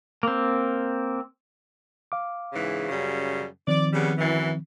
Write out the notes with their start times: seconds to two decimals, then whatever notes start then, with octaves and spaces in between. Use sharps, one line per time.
0.23 A#3 C4
2.12 F5 D6
2.53 G#2 C#3 E3
2.88 F#2 C#3 G3
3.67 D#3 F3 C4 D5
3.93 C#3 G3 B3
4.18 F#2 E3